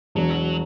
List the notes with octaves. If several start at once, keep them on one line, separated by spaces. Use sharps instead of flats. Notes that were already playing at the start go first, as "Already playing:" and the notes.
E1 F#3